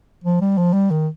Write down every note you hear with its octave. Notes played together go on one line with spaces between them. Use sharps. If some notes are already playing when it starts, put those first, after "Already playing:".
F3
G3
F3
G3
D#3